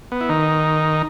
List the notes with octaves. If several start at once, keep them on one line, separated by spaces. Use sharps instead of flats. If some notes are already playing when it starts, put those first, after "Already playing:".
B3
E4
D#3 D#4